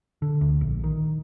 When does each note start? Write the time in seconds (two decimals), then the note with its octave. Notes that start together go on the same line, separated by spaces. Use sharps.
0.22 D3
0.41 D2
0.61 A#1
0.84 D#3